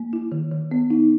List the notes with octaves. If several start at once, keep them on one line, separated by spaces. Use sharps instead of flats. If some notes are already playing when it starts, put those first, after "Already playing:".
Already playing: A#3
E4
D#3
D#3
B3
D#4